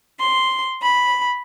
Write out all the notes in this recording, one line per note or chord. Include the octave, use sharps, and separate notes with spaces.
C6
B5